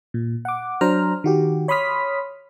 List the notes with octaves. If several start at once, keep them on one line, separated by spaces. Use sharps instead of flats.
A#2
F#5 D6
F#3 D4 C5 A#5 F6
D#3 F#4 G4
C#5 B5 C6 D#6 F6 B6